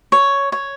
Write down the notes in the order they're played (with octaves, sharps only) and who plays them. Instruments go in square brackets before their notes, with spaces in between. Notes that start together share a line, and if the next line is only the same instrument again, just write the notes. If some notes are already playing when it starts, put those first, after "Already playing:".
[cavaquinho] C#5
C#5